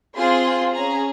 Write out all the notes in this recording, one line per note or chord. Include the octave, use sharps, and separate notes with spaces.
C4 F4 G#4 C6
C#4 G#4 A#5